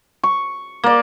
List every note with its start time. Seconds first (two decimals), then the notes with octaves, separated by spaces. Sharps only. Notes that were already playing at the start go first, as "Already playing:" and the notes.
0.23 C#6
0.84 A#3 D5